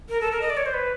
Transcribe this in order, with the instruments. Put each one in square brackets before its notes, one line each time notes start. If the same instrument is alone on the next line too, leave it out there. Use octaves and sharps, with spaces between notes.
[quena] A#4
A4
A#4
D#5
D5
C#5
C5
B4